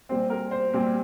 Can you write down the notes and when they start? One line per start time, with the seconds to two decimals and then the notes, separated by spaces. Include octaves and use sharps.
0.09 A#2 G3 C4 C5
0.30 A#4
0.51 C5
0.73 A#2 G3 C4